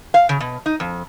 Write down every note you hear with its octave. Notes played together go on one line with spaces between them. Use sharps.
F5
C#3
B2
D#4
F2